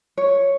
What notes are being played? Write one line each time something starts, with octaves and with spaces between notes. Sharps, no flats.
C#5